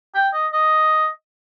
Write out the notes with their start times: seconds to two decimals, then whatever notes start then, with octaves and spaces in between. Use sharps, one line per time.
0.15 G5
0.33 D#5
0.53 D#5